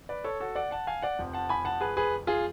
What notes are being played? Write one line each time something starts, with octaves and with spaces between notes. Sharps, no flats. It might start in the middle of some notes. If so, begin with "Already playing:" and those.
Already playing: A1
B4 D5
A4 C#5
F#4 A4
D5 F#5
F#5 A5
F5 G#5
D5 F#5
F1 F2 F3
F#5 A5
G#5 B5
F#5 A5
G#4 B4
G#4 B4
F4 G#4